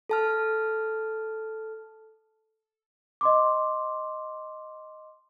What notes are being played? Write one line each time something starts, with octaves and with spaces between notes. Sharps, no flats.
A4 A5 F6
D#5 C6 D6